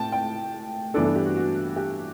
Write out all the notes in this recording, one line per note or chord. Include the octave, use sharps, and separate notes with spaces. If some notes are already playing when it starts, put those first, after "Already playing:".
Already playing: A2 G5 A5
G5
G2 E3 B3 D4 A4
A4
G4
F#4
F#4
G4